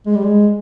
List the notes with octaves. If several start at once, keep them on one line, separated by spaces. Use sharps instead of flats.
G#3
G3
G#3